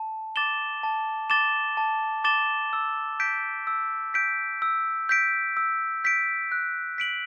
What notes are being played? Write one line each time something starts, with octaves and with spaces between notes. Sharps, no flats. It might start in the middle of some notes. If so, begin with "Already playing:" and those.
Already playing: A5
D6 A6 E7 G7
A5
D6 A6 E7 G7
A5
D6 A6 E7 G7
E6
G6 B6 D7
E6
G6 B6 D7
E6
G6 B6 D7
E6
G6 B6 D7
F#6
B6 D7 F#7